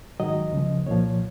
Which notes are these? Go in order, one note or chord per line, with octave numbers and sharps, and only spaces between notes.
G#2 D#3 F#3 D#5
C#2 C#3 F3
C2 A#2 F3 C#5